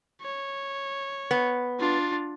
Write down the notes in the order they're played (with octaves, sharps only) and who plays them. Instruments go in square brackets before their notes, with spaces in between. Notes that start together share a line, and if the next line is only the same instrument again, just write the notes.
[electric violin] C#5
[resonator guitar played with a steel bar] B3
[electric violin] D4 F4